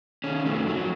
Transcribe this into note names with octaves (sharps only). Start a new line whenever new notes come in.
D#3 C#4
F2 A3
F2 F#3